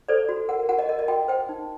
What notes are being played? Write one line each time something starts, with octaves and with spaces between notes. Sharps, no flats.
A4 C5 D5
F#4
A#4 F#5
F#4 F#5
D#5
A#4 D#5
D#5
F#4 G5
C5 G5
D#4